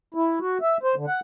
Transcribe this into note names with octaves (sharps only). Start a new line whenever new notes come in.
E4
F#4
E5
C5
D3
F#5